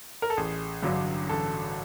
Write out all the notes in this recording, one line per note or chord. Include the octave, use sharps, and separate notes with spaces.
A#4
A4
A1 G#4
G2 D3 F#3
A1 A4